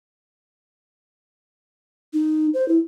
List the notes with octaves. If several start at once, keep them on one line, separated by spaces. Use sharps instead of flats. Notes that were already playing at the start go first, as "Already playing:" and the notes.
D#4
C5
E4